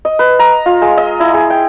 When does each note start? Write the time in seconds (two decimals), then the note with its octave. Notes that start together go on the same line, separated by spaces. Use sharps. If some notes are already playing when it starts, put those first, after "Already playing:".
0.05 D#5
0.19 B4
0.39 A#5
0.66 F4
0.82 G#3
0.97 D#5
1.20 E4
1.34 G#4
1.50 G5